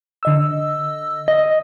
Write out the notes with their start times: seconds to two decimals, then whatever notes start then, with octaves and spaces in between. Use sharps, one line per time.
0.23 D3 D#5 E6
1.28 D#5